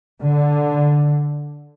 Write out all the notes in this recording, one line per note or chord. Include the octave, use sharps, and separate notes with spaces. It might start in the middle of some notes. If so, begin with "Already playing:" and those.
D3